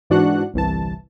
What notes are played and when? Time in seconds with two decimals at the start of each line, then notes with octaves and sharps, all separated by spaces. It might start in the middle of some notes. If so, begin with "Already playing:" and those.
0.10 G#2 E3 D4 F#4 F#5 F#6
0.54 G1 C2 E3 A5